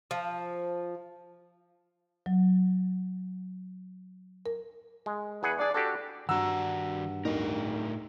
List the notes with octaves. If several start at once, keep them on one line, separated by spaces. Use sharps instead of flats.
F3
F#3
A#4
G#3
E2 G#4 B4 F#5
D4 G#4 D5
D4 F#4 G4 A4
G2 D#3 F#4 F#5 A#5 E6
D1 A2 D#4 A#4